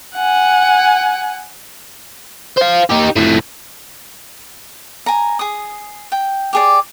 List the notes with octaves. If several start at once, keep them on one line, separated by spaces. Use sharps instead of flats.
F#5 G#5
C5 F5
D#4 G4
F2 A2
G#5 A#5
G#4 D#6
G5
G4 G#4 D5